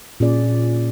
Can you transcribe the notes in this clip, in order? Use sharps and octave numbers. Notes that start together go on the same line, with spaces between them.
A#2 C#4 G#4 D5